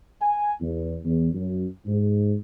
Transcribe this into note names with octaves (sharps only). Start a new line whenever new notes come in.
G#5
E2
E2
F#2
G#2